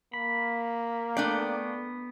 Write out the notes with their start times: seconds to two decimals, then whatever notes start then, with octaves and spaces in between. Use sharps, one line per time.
0.13 A#3 B5
1.17 A3 B3 D4 D5 G5